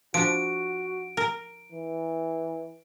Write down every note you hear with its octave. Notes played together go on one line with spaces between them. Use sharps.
F3 D4 F#4 D7
A#4
E3